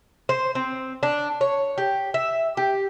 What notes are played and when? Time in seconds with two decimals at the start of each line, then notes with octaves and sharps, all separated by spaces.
0.29 C5
0.55 C4
1.03 D4
1.41 C#5
1.78 G4
2.14 E5
2.57 G4